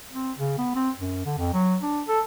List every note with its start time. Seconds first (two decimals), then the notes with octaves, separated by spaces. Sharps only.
0.12 C4
0.37 C#3
0.58 B3
0.75 C4
0.99 F#2
1.26 D3
1.38 F2
1.53 F#3
1.83 D4
2.08 A4